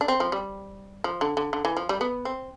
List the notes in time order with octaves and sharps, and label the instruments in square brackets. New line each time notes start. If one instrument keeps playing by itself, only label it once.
[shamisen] D4
C4
F3
G3
F3
D3
D3
D3
E3
F3
G3
B3
C4